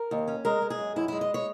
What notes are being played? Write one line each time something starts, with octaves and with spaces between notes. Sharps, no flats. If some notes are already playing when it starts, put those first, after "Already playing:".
Already playing: A#4
D#2
C#4
G#3 A#4
G#3
G#4
F#2
F#2 E4
G#3 E4
D#5
C#5